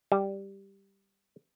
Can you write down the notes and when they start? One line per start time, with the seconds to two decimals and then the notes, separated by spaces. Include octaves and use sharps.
0.12 G3